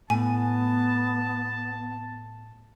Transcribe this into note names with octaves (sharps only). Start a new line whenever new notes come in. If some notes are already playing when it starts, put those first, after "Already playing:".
A2 B3 G#5 A5